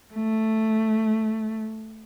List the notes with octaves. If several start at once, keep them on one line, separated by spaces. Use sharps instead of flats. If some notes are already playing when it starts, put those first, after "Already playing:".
A3